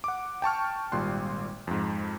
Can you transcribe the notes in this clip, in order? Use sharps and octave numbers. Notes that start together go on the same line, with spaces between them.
F#5 D6
G5 A5 C#6 F6
G#1 A#2 G3 G5 C6 F#6
F2 G#2